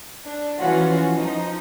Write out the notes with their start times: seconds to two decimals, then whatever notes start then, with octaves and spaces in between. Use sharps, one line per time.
0.25 D4
0.57 E3 F3 C#4 F4 F#4
1.16 F3 D#4